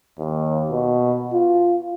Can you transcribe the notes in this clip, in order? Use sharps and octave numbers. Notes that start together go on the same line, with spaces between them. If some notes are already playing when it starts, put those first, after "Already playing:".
D#2
B2
F4